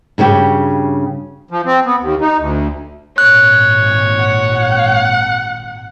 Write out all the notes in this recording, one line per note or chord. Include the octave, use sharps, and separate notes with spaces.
G2 C#3 F#4 G4
F3
C4
B3
D#2
D#4
D2
G#1 A#2 C#5 F#6
F#5